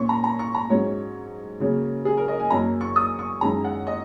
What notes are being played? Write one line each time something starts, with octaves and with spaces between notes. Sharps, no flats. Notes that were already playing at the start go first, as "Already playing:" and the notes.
Already playing: A#2 A#3 C#4 C#6
A#5
A#5
C#6
A#5
G#2 F#3 C#4 C#5
C#3 F#3 A#3 C#4
G#4
A#4
D#5
G#5
F#2 F#3 A#3 A#5
C#6
D#6
C#6
F#2 D#3 G#3 C#4 A#5
F#5
D#5